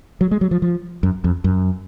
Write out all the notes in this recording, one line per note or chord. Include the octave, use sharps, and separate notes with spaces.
F#3
G#3
F#3
F3
F3
F#2
F2
F#2